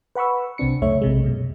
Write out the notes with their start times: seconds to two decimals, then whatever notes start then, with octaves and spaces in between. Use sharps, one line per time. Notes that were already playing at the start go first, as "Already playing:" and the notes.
0.15 B4 F#5 B5 C#6 E6
0.58 C2 C3 C4 D4 C#7
0.82 C#2 F#2 A3 C#5 E5
1.02 B1 C3 G#3
1.24 F#2 B2